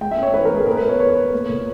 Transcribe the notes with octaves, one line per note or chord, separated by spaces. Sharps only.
G#3 G5
E5
C#4
C#5
E3 B4
A#4
G#3
G#4
A#2 A#4
B4
B3
C#5
B3 C#5
B3
A#3
A#2